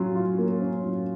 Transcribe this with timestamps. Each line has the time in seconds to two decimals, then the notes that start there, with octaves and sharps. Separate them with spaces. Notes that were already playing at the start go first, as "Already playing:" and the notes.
Already playing: F#3 C#4 F4
0.15 F4
0.38 A#3
0.61 C#4
0.84 F#3